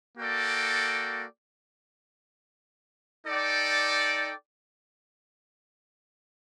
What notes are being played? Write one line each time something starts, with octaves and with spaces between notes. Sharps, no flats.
A#3 F#4 A4 D5 G5
D#4 A4 D5 G5